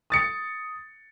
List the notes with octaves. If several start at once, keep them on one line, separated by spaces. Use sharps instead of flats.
D#6 A6 C#7